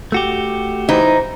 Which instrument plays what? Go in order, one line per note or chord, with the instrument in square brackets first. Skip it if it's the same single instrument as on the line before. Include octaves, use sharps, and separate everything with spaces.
[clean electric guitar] A3 F#4 G4
[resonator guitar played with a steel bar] E3 D#4 [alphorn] C5